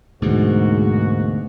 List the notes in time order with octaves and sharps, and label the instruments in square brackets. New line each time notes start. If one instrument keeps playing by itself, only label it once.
[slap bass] D2 B2 E3 [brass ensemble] G#2 A#3 F#4